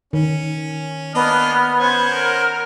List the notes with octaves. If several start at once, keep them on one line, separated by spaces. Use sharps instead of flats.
D#3 C#4
A#3 B3 D4 D#5 F6
C#4 C5 F#5 G#6
A#4